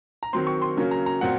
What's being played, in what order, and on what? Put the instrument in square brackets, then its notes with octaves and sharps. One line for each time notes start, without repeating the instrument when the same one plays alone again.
[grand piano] A#5
D#3 F#3 C4 C6
C#6
C6
C#3 F#3 A#3 C#4
A#5
A#5
A#2 F#3 C4 F#5